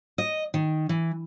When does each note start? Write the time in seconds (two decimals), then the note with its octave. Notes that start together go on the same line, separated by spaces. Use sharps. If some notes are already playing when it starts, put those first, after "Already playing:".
0.18 D#5
0.54 D#3
0.89 E3